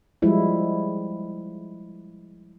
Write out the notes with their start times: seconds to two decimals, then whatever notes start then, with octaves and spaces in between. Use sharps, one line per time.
0.22 F3 G3 G#3 E4